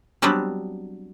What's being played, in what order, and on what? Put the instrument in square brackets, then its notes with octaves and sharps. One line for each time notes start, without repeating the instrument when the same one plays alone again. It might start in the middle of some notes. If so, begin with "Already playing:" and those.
[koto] F#3 G3 B3 C4 D4 B4